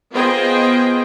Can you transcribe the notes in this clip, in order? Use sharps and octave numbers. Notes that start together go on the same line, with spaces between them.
B3 F4 G#4 C5 D#5 G5